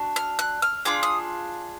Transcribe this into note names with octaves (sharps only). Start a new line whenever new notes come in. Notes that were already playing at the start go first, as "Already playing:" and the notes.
Already playing: D4 F#4
F6
F#6
F6
D4 F4 G#4 D6
D#6